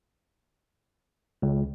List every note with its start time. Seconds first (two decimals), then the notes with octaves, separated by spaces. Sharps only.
1.42 C#2